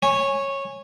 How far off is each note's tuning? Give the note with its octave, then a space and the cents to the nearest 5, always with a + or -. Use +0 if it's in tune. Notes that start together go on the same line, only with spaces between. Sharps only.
C#5 -10 G#5 -5